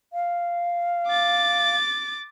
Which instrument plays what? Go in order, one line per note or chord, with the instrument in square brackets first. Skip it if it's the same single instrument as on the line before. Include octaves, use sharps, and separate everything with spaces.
[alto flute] F5
[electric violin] D6 A6